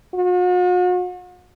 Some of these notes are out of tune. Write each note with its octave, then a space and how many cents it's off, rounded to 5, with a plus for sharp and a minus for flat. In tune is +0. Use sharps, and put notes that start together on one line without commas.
F#4 -45